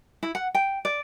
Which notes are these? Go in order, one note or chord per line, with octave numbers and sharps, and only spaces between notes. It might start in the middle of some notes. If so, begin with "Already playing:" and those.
E4
F#5
G5
D5